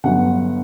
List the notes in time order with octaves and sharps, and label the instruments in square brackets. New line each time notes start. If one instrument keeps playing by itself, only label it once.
[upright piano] G1 G2 F#3 F#5